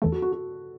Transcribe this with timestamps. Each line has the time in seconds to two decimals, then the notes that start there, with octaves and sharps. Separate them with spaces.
0.02 E2 E3 A3 A4
0.12 F#4
0.22 F#4
0.32 F#4